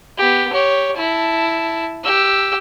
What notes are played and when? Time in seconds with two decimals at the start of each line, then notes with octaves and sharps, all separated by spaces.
0.18 B3 G4
0.52 G4 C#5
0.96 E4 A5
2.04 G4 E6